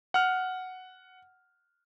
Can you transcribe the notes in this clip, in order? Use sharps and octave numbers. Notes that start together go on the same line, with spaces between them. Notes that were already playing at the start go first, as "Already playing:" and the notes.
F#5 F6